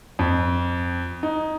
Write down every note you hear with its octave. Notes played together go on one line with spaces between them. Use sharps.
F2
D#4